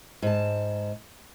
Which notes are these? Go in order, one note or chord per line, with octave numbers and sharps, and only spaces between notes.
G#2 A5